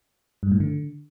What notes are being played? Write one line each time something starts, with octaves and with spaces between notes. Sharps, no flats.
G2
A2
D3